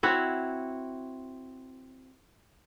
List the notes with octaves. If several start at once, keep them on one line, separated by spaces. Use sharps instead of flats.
C4 E4 F#4 C#5